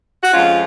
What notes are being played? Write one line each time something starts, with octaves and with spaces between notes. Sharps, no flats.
F#4
F2 F3 G#3 C#4 F4